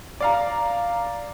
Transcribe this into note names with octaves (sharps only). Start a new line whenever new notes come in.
D5 F5 A#5